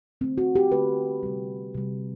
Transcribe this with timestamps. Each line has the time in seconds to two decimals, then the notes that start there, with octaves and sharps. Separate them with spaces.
0.21 D3 A3 C4
0.38 F#4
0.55 G4
0.72 D3 A3 B4
1.23 C3 G3
1.74 C3 G3